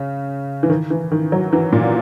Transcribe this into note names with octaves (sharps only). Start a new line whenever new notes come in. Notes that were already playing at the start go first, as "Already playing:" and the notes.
Already playing: C#3
E3
D#3
E3
D#3
F#3
E3
A#2